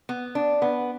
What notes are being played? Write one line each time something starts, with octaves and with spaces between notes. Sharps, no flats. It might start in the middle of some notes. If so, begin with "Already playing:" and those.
B3
D4
B3